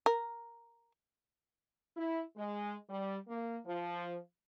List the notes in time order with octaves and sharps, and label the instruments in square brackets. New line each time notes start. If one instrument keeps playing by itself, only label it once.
[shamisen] A#4
[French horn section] E4
G#3
G3
A#3
F3